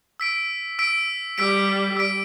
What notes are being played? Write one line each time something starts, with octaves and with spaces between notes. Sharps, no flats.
E6 B6 D7
E6 B6 D7
G3 E6 B6 D7
E6 B6 D7